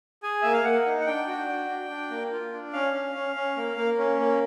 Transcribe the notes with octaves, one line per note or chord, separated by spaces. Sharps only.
G#4 G#5
A#3 E5
F5
A#3 F#5
D#4
F#5
D4 G5
F#4
D4
D4
D4
A#3
F4
D4
C#4 F5
C#4
C#4
C#4
A#3
A#3
C#4
A#3